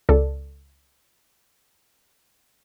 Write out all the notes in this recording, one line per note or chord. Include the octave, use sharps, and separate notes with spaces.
C#2 A4 D5